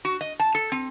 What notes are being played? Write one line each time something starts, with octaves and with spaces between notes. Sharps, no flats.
F#4
D#5
A5
A4
C4